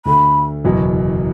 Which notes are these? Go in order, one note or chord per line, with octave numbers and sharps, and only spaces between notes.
D2 D3 A3 B5
F#1 E2 B2 F#3